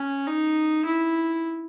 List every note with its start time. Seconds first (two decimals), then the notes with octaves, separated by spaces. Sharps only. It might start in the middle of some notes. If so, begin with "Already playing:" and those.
Already playing: C#4
0.27 D#4
0.85 E4